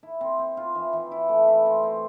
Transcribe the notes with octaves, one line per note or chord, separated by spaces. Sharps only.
E4
C4
C4
F4
E3
E3
E4
A3
E4
C4
C4